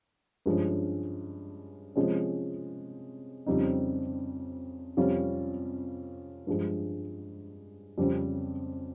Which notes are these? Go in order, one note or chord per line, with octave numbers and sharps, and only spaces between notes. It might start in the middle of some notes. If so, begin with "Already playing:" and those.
G2 F3 G#3 C#4
C3 F3 G#3 C#4
F2 C#3 G3 C4 D#4
F2 C3 G3 C#4 F4
G2 F3 G#3
F2 C#3 G3 C4